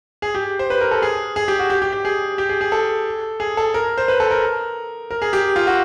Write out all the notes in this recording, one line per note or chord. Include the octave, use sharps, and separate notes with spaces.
G#4
G4
C5
B4
A#4
A4
G#4
G#4
G4
F#4
G4
G4
G4
G#4
G4
G#4
G#4
A4
G#4
A4
A#4
C5
B4
A4
A#4
A#4
G#4
G4
F4
F#4